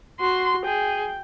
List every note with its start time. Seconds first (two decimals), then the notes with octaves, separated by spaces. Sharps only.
0.20 F#4 C6
0.65 G#4 G5